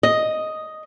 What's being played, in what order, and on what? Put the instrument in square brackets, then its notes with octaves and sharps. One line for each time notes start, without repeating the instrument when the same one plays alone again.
[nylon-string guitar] D#5